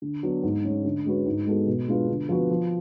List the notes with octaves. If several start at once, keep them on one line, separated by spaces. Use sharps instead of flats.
D3
F#3 B3 D4
G#2
G#3 C#4
D3
G#3 C#4 F#4 B4
G#2
G#3 B3 F#4 A4
B2
G#3 D4 F4 B4
D3
F3 B3 F#4 B4
F3